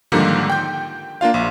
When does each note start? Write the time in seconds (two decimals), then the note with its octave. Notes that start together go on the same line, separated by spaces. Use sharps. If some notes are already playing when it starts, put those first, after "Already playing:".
0.12 G#2 D3 D#3 F3 G3 A#3
0.50 G5 G6
1.21 A#3 D4 F4 F5
1.34 A#1